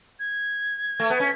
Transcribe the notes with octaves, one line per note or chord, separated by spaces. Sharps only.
G#6
A3
B3
C#4